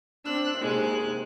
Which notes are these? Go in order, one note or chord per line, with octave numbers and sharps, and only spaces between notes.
C4 D4 E6 F#6
D#2 C3 G#3 F#6